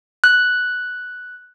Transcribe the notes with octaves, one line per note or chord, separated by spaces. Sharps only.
F#6